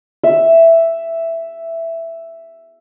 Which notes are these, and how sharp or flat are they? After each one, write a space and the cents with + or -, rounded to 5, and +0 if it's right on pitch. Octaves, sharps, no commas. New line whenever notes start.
E5 +5